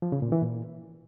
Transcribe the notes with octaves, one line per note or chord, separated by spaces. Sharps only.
F3
C#3
A#2
E3
A#2